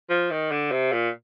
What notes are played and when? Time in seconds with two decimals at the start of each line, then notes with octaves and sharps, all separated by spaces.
0.10 F3
0.31 D#3
0.51 D3
0.72 C3
0.92 A#2